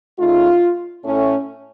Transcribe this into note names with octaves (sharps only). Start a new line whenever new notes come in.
C#3 A3 D#4 F4
A2 A3 C#4